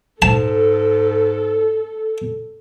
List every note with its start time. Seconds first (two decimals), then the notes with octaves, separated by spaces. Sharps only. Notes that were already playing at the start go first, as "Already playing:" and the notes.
0.22 G#2 A4 A5